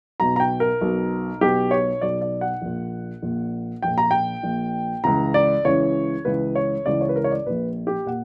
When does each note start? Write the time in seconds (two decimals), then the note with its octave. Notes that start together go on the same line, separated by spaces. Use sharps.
0.20 B1 B2 A#5
0.36 A#5
0.40 G5
0.60 A#4
0.81 B1 B2
1.41 B1 B2 G4
1.71 C#5
2.01 B1 B2 D5
2.21 D5
2.41 F#5
2.62 A#1 A#2
3.22 A#1 A#2
3.83 A#1 A#2 G5
3.98 A#5
4.11 G5
4.43 A#1 A#2
5.04 C#2 C#3 E3 A#5
5.34 D5
5.65 C#2 C#3 E3 C#5
6.25 C#2 C#3 E3 B4
6.55 C#5
6.86 C#2 C#3 E3 D5
7.01 C#5
7.09 B4
7.16 A#4
7.24 C#5
7.31 D5
7.46 A#1 A#2 B4
7.87 G4
8.06 A#2 F#5